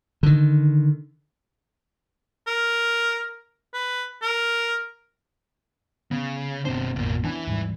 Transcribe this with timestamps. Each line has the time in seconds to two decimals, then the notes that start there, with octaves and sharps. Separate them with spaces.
0.23 D3 D#3
2.47 A#4
3.74 B4
4.22 A#4
6.11 C#3 B3
6.65 F#1 B2 C4 D4 C5
6.96 A1 F2 B2 A#3
7.24 E3 B3 C#4 D4
7.47 D#2 G#2 G3